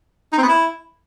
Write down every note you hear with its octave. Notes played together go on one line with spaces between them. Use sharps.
D#4
C4
B3
E4